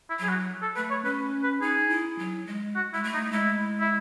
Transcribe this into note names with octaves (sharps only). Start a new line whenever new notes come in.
E4
F#3 G#4
F#4
A4
A3 B4
C#5
C#4 B4
B4
D#4 G#4
E4
F#3
G#3
F#4
G#3 E4
A3
D#4
G#3 E4
E4